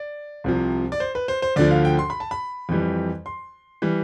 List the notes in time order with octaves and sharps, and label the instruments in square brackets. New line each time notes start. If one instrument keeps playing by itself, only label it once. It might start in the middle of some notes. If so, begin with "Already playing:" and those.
Already playing: [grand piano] D5
C2 C3 F3
D5
C5
B4
C5
C5
D2 D3 F3 D5
F5
G5
C6
B5
A5
B5
F2 E3 G3
C6
E3 G3